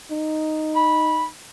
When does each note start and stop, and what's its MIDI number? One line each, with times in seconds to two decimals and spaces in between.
0.11 1.32 63
0.76 1.25 83